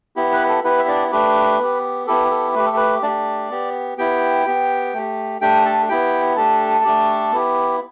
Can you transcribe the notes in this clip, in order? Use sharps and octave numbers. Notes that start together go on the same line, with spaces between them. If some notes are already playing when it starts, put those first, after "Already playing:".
B3 E4 G4
B4
A4
B3 E4 G4 B4
E5
D4 D5
A3 D4 G4 B4
B3 G4
B3 E4 G4 A4
A4
A3 G4 B4
A4
B4
A3 D4 G4 D5
B3 G4
B3 E4 G4 G5
B3 G4
A3 G4
A3 D4 G4 G5
A4 A5
B3 E4 G4 G5
A3 D4 G4 A4 A5
A3 D4 G4
B3 E4 G4